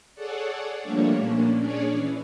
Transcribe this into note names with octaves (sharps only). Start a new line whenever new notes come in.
G#4 A4 C#5 D5 F#5
F3 G3 A3 A#3 D4 C#5
A#2 A#3 C#4 D4
C#4 D4 G#4 C#5 D5
E3